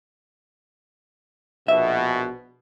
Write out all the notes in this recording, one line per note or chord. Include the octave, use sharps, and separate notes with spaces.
A#1 B2 E5